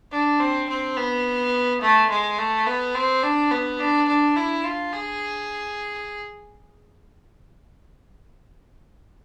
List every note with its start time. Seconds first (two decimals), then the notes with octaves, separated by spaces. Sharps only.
0.12 D4
0.40 C4
0.68 C4
0.97 B3
1.81 A3
2.10 G#3
2.38 A3
2.66 B3
2.94 C4
3.23 D4
3.51 B3
3.80 D4
4.08 D4
4.36 E4
4.64 F4
4.93 G#4